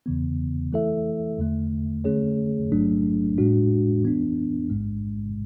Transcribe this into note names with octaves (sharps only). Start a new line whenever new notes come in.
E2 C#3 E3 B3
E3 A3 E4 A4 E5
E2 D3 A3
D3 A3 C#4 G#4 C#5
A1 G#2 F#3 A3 D4
A2 G#3 D4 F#4
E3 B3 D4
A1 G#2 G#3